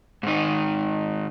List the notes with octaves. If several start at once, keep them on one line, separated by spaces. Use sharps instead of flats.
G#2 D#3 D#4